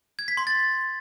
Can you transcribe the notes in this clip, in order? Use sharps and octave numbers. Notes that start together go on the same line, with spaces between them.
G#6
B6
C6
A6